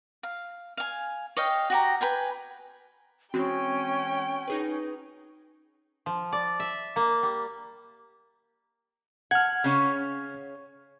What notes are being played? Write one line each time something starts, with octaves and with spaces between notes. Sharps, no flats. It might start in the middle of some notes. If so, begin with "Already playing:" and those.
F5
F5 G#5
C#5 D#5 F5 G5
F#4 G4 A#5
B4 G5 G#5
E3 G#3 C4 C#4 F#4 G5
D#4 G#4 B4
F3
D5
E5
A#3
G3
F#5 F6 G#6
C#3 C#4 C#5